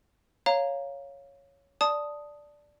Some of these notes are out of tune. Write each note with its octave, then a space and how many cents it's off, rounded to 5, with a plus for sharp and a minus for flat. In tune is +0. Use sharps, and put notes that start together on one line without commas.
C#5 +0 F5 +0 A#5 +0
D5 +0 A5 +0 D#6 +0